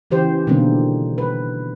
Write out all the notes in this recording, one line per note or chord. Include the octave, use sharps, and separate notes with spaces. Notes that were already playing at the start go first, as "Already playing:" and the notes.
C#3 E3 G4 C5
B2 D3 D#3 G3 A#3 C4
B4